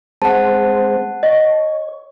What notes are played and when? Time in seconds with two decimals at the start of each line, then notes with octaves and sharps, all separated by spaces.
0.22 G#3 C4 C5 F#5 A5
1.23 C#5 D#5